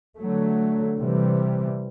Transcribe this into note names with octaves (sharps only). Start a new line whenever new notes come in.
D3 F#3 A3
C3 E3 G3